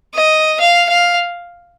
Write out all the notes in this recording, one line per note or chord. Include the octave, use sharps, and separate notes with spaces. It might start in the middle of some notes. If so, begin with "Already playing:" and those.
D#5
F5
F5